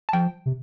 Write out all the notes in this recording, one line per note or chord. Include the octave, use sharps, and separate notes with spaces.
A5
F3 G5
C3